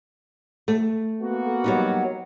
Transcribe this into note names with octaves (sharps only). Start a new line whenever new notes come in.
A3
A#3 B3 F#4
F#3 G3 D#4